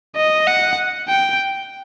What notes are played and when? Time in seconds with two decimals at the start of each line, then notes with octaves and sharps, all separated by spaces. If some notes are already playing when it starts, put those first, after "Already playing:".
0.17 D#5
0.47 F#5
1.08 G5